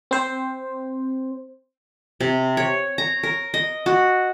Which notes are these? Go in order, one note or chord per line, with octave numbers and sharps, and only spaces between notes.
C4 C5
C3
C#5
A#5
A#4
D#5
F#4